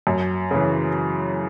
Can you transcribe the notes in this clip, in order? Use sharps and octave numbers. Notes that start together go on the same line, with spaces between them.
F#2
C#3 E3